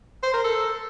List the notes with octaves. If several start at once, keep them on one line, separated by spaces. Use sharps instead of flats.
C5
A#4
A4